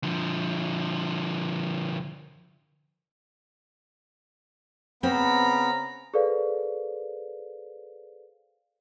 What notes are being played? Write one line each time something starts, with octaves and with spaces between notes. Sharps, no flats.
D3 F3
C#3 B3 C4 A#5 B5
G#4 A4 B4 C5 D5 F5